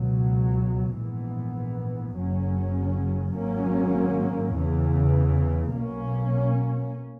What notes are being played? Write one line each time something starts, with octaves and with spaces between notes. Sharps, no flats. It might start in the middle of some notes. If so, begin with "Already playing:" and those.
Already playing: C#2 B2 F#3
A#1 G#2 E3 B3
F#1 F#2 C#3 F#3 C#4
G#1 G#2 F#3 A#3 C#4
E2 C#3 E3
B1 B2 A#3 C#4